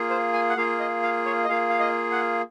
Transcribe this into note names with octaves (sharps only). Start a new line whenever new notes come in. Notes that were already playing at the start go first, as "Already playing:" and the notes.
Already playing: A#3 F4 G#4
C5
G#5
F#5
A#3 F4 G#4 F5
D#5
F5
C#5
D#5
A#3 F4 G#4 F5
F5
D#5
F#5